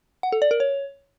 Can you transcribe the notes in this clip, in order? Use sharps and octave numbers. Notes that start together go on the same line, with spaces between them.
F#5
A4
D5
A#4
C#5